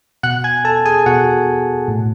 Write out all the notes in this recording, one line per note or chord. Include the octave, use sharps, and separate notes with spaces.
B2 F#5 F#6
G#5 G#6
A4 A5
G#4 G#5
B2 F#4 F#5
A2